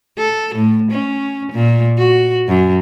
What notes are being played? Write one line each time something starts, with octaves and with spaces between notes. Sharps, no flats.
A4
A2
C#4
A#2
F#4
F#2